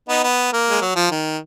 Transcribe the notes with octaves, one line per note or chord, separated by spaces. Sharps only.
B3 D#4
B3
A#3
G#3
F#3
F3
D#3